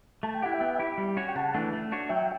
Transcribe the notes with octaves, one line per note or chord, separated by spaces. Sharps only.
A3 A5
G5
E4 G4 F#5
E5 G5
B3
E4 G4
G3
C#4 F#4 C#5
G5
C#3 F#5 A5
E3 A3 D4
A3
D4 F#4 C#5
F#3 E5 G5